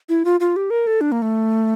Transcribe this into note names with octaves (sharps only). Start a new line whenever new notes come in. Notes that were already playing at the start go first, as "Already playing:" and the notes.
E4
F4
F4
G4
A#4
A4
D4
A#3
A3